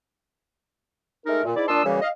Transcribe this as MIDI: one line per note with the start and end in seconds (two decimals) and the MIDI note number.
1.26 1.43 56
1.26 1.43 57
1.26 1.43 63
1.26 1.43 70
1.45 1.52 46
1.56 1.68 44
1.56 1.68 64
1.56 1.68 74
1.68 1.85 46
1.68 1.85 62
1.68 1.85 81
1.68 1.85 84
1.68 1.85 87
1.68 1.85 88
1.85 1.99 42
1.85 1.99 49
1.85 1.99 52
1.85 1.99 55
1.85 1.99 58
2.02 2.09 75
2.02 2.09 77